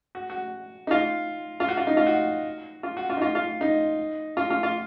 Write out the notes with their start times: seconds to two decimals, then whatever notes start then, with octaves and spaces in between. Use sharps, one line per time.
0.15 F#4
0.30 F#4
0.87 D#4
0.91 F4
1.60 F4
1.69 F#4
1.77 F4
1.87 D#4
1.97 F4
2.07 F#4
2.83 F4
2.97 F#4
3.10 F4
3.17 D#4
3.22 F4
3.35 F4
3.61 D#4
4.37 F4
4.50 F4
4.63 F4